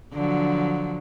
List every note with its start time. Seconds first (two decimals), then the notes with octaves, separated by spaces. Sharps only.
0.13 D3 F3 F#3